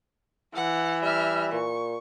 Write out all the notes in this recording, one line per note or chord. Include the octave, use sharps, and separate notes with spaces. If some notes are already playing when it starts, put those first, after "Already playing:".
E3 F#5
G3 E5 F6
A#2 C#6